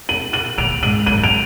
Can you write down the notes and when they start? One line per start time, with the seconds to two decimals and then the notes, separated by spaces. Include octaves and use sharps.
0.09 D#7 F#7
0.33 D#7 F#7
0.58 A#2 D7 F7
0.83 G#2 D#7 F#7
1.06 F#2 D#7 F#7
1.24 D7 F7